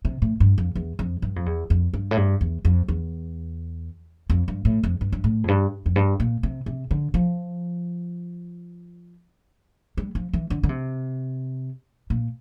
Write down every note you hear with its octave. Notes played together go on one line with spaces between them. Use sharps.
C3
A2
G2
F2
E2
F2
G2
F2
E2
F2
G2
A2
G2
E2
F2
E2
F2
G2
A2
F2
G2
G2
A2
F2
G2
F2
G2
A#2
C3
C3
D3
F3
G3
F3
E3
D3
D3
C3
A#2